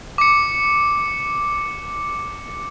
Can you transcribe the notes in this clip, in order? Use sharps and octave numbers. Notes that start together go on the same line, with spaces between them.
D6 C#7